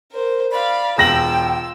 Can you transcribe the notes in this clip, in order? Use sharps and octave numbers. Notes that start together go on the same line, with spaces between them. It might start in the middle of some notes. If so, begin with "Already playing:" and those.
A#4 C5
D5 F5 B5
E1 F4 G5 E6 A#6 F#7